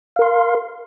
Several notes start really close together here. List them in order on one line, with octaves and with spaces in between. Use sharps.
F5 A#4 C6